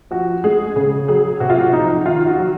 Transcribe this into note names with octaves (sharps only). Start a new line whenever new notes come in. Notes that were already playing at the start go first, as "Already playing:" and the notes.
F3 F#4
G#3 G#4
C#3 G#4
F#3 G#4
C3 F#4
F4
F#4
F3 D#4
D#3 F4
F#4
F#3